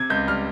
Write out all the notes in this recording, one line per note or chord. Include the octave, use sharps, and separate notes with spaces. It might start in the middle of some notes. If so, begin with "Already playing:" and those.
Already playing: C3 G#6
C#2 G6
G3 F6